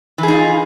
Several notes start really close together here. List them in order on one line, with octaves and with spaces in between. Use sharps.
E3 G#4 D#4 F4